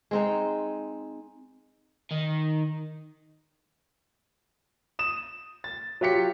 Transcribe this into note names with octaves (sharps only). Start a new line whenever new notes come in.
G#3 C4 D#4
D#3
D#6 E7
A6
F#3 F4 G4 B6 C#7